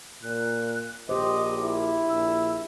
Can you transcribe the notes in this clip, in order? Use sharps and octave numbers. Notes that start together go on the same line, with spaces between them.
A#2 F#6
A#1 G4 C5 D#5 D6
E4
A#1 E6